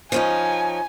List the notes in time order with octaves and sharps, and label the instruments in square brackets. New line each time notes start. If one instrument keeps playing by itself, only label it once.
[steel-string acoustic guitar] F3 C#4 D#4 [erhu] G#5